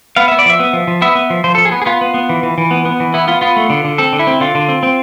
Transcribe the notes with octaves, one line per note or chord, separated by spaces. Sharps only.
B3 F5
B3 E5
D5
F3 E5
B3
F3
F3
B3 E5
B3
F3
F3 C5
F3 A4
G#4
B3
G#4
B3 F4
B3
B3
E3
E3
E3
B3
B3
E3
B3 E4
B3 F4
B3 F4
A3
D3
D3
C4 A4
D3
E4
C4
D3 F4
D3
C4
C4